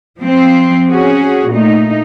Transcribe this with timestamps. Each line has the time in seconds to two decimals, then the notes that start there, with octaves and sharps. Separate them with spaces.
0.20 F3 C4
0.89 C#4 F#4 G#4
1.50 A#2 A3 D#4